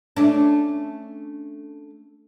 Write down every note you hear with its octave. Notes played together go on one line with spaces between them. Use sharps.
A3 C#4 D4